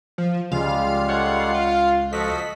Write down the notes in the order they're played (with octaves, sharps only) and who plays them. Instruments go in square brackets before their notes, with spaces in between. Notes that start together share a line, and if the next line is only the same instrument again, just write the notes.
[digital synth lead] F3
[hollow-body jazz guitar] C#2 [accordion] G3 G#3 F4 [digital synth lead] F5
[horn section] A4 C#5 F#5
F4
[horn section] F3 F#4 [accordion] A4 D#5 [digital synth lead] B6